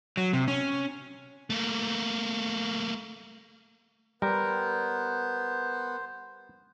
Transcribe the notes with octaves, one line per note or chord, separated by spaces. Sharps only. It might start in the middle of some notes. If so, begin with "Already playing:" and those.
F#3
C3
C#4
A3 A#3
G3 B3 A#4 C5